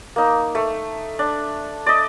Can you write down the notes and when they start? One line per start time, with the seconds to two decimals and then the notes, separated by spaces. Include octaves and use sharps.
0.16 A#3 D#4
0.55 A3
1.19 D4
1.86 D5 D#5